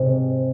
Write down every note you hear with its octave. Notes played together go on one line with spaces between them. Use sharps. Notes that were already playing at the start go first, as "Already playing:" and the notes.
Already playing: G#2 C3